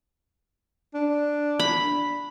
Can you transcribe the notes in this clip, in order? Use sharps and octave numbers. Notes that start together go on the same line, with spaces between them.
D4
B5